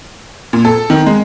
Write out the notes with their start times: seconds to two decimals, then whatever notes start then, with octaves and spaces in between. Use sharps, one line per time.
0.53 A#2
0.65 A4
0.90 D#3
1.07 G#3